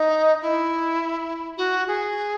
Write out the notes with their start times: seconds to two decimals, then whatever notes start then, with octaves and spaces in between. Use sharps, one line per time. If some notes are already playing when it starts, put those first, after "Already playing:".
Already playing: D#4
0.42 E4
1.57 F#4
1.88 G#4